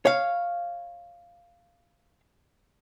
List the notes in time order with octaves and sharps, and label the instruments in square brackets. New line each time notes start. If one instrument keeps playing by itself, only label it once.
[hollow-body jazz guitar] C#5 F5